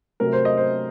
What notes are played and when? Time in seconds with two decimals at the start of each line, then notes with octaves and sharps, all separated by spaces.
0.20 C3 F#3 A3 A#4
0.33 C5
0.45 D#5
0.57 C5